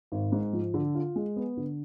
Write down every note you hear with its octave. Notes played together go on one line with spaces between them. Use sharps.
G#1
G#2
F3
D3
F4
G#3
B3
D3